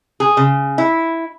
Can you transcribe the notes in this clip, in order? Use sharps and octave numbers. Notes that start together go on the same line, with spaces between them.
G#4
C#3
E4